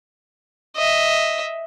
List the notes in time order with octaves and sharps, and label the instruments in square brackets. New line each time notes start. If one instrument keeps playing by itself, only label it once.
[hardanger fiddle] D#5 E5